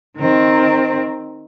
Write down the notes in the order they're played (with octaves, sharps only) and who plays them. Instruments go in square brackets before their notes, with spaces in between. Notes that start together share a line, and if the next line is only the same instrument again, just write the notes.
[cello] D#3 C4